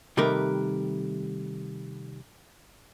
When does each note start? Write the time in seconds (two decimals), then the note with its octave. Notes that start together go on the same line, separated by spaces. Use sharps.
0.17 C3 D#3 G3 A3 A#4 B4